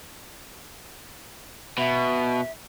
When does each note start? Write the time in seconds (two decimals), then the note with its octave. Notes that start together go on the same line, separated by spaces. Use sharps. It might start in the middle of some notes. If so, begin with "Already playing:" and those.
1.78 B2 E5